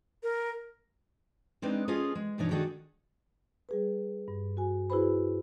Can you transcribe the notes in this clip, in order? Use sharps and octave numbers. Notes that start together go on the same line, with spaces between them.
A#4
G#3 C4 D4 D#4 B4
C#4 F4 G#4 A4 D#5 F5
G#3
G2 B2 E3 D4 D#4 C#5
D#3 D4 F#4 G#4 A4
G3 G#4 B4
G2
F#4 G#5
E4 F#4 G#4 B4 C5 B5